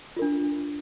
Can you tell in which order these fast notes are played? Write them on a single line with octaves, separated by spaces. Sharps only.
F4 A#4 D4